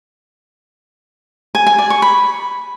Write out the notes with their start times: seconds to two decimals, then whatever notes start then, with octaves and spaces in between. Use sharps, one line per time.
1.55 G#5
1.67 G#5
1.78 D5
1.90 C#6
2.02 B5